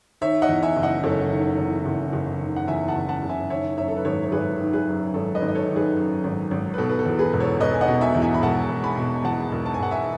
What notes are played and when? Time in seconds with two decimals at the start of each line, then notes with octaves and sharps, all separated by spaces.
0.21 D#3 C#5 E5
0.42 D#5 F#5
0.49 E2
0.62 E5 G#5
0.77 F#1
0.83 D#5 F#5
1.03 F#1 A4 C#5
1.32 D#3
1.58 E2
1.86 F#1
2.13 F#1
2.40 D#3
2.56 F#5
2.68 E2 E5 G#5
2.88 F#5 A5
2.95 F#1
3.09 F#5 A5
3.22 F#1
3.29 E5 G#5
3.50 D#3 C#5 E5
3.77 F#2 C#5 E5
3.88 A4
3.97 B4
4.05 G#1 A4 C#5
4.24 C#5
4.32 G#1 G#4 B4
4.60 D#3
4.73 G#4 B4
4.87 F#2
5.14 G#1 A4
5.35 B4 D#5
5.41 G#1
5.48 D#5
5.55 A4 C#5
5.69 D#3
5.76 G#4 B4
5.96 F#2
6.24 G#1
6.51 G#1
6.74 B4
6.78 B2 A4
6.89 B4
6.99 A4
7.06 E2
7.19 G#4 B4
7.33 E1
7.40 A4 C#5
7.60 E1 B4 D#5
7.74 G#5
7.81 D#5 F#5
7.88 B2
8.01 E5 G#5
8.15 E2
8.22 E5 G#5
8.34 B5
8.42 E1 F#5 A5
8.70 E1
8.84 G#5 B5
8.97 B2
9.24 E2 F#5 A5
9.52 E1
9.66 A5
9.74 G#5
9.79 E1 F#5
9.91 E5 G#5